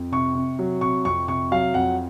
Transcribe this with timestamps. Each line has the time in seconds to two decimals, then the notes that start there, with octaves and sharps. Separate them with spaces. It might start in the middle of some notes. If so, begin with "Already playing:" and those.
Already playing: F2
0.12 C3 C#6
0.35 C3
0.59 F#3
0.81 C3 C#6
1.05 F2 C#6
1.28 C3 C#6
1.51 F#3 F5
1.74 F2 F#5